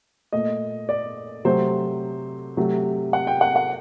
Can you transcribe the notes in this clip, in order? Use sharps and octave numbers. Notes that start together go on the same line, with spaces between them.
A#2 A3 D#5
D5
C3 F#3 A3 C5
C3 F#3 A3
F#5
G5
F#5
F#5